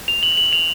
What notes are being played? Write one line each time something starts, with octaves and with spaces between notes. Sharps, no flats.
F7
F#7
F#7
F7